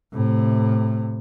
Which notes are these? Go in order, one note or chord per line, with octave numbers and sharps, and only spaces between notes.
A2 C3